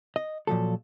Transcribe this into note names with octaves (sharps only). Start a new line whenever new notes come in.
D#5
A#2 F3 F#3 A4